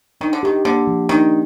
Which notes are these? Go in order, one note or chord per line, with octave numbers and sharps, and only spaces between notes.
D#3 D4
D3
D#3 G4
D3 A#3
F3
D#3 D4